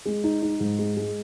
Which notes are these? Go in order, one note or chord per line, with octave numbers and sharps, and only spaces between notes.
G#3
D#4
D#4
G#2
G#3
G#3